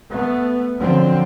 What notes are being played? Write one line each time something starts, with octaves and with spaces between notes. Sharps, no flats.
A3 B3
D3 F3 F#3 C4